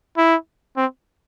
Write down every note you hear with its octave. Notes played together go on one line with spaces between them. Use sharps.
E4
C4